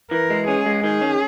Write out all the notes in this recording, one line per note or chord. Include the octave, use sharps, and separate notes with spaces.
E3 A#4
G#3
C#4 G#4
G#3
D#3 G#4
C#4